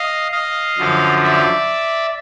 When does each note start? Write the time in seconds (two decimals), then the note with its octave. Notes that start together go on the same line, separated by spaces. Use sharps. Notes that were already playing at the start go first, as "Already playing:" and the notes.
Already playing: D#5 F5
0.32 D#5 F5
0.78 F#2 D3 F3
1.24 D5 E5